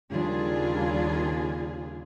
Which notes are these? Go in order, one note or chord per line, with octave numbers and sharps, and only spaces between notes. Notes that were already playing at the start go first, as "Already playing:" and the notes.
D#2 C#3 G3 D4 F4 G#4